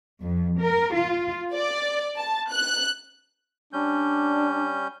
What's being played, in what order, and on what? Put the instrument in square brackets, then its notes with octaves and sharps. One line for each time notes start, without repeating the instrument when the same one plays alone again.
[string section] F2
A#4
F4
D5
A5
F#6
[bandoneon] G3 C#4 G6 [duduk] D4